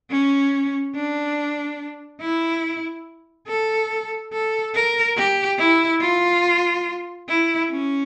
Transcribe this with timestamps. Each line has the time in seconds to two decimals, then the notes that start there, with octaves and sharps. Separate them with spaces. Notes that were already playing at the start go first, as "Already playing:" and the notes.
0.10 C#4
0.95 D4
2.21 E4
3.48 A4
4.33 A4
4.74 A#4
5.17 G4
5.59 E4
6.01 F4
7.28 E4
7.71 C#4